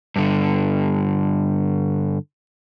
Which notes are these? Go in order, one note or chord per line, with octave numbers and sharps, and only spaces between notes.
G2 D3